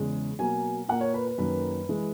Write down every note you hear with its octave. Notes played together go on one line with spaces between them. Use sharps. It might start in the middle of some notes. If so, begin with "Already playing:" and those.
Already playing: E2 C#3 G#3
B2 F#3 A#3 G#5
A#2 A#3 F#5
C#5
B4
B4
F#2 D#3 A#3 B4
E3 G#3